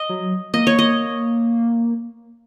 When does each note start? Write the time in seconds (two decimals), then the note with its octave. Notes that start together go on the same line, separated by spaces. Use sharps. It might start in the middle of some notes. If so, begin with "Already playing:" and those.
Already playing: D#5
0.09 F#3
0.54 A#3 D#5
0.67 C#5
0.79 D#5